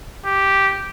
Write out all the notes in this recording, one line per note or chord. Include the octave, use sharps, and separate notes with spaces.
G4